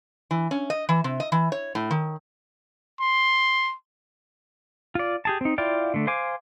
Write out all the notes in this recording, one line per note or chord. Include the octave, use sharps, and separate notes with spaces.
E3
C#4
D#5
E3
C3
D#5
E3
C#5
A2
D#3
C6
F4 D5
G4 G#4 A5
C4 D#4
E4 F4 D5 F5 G5
D3 A3
C5 F5 G#5 D6